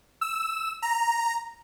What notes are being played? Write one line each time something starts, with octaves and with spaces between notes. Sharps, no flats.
E6
A#5